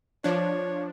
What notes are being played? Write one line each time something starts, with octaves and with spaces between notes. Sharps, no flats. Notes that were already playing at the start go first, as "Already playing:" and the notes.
F3 D4 C#5